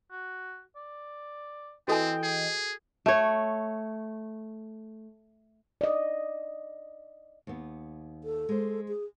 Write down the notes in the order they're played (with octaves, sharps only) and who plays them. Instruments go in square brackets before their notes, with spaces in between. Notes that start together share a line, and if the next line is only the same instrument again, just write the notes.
[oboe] F#4
D5
[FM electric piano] E3 D#5 [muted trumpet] C4 [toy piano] F#4 A4 G#5 [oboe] G5
[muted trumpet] G#4
[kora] A3 C#5
[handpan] D5 D#5
[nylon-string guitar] D#2 B3
[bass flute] A4
[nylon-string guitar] G#3 C5
[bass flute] G#4